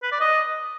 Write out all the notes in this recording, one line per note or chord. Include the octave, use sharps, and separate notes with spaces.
B4
D5
D#5